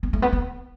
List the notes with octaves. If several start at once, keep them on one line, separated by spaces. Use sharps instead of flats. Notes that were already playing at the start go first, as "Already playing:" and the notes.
B3
A3
B3
B3